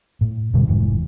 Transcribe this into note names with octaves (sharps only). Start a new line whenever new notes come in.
A2
F2 B2 D3 G3
F1 D#2 G#2 E3